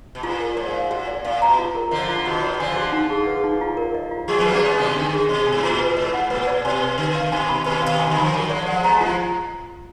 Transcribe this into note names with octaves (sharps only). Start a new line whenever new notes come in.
B2
A#2 F4
A#4
G#2 D5
F5
A#2 F#4
D5
A#2 F5
B2 A#5
F4
A#4
D3 F3 D#5
F4
B2 D#3 F#4
D5
D3 F3 G#5
F#4
D#4
G#4
B4
D#4
F4
A#4
D#5
F4
F3 G#3 G#4
B3
F#3 A#3 B4
D4
G#3 B3 D5
B2 D#3 G#5
D3 D4
G#4
B2 D#5
G#5
G#2
A#2 F4
B4
G#2 D#5
F#5
A#2 B4
D5
B2 G#5
B4
D3 B4
F5
B2 D#3 G#5
B5
B2 D#3 B4
F5
B2 D#3
G#5
D3 F3
B5
D#3 F#3 A#4
F3 G#3 D5
F3 G#3 F#5
G#3 B3 A#5
F3 G#3 F4